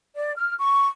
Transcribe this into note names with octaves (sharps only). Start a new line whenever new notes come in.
D5
F6
C#6